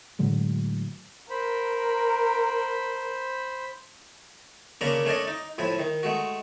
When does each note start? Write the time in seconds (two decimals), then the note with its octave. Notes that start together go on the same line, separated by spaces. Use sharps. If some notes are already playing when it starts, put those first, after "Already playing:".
0.19 A2 D3 F#3 G#3
1.30 A#4 C5 B5
4.81 C#3 A#3 C#4 D4 A#5 B5
5.05 A3 C#4 D4 D5 D#5
5.28 D#4
5.58 A2 F3 E4
5.79 D#3
6.03 G#3 A3 F#4